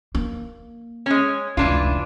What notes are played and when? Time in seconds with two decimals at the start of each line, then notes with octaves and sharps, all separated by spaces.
0.15 A#3
1.06 G#3 C#4
1.57 F1 C#2 E3 D4 F4